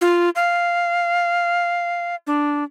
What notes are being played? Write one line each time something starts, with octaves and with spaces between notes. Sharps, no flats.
F4
F5
D4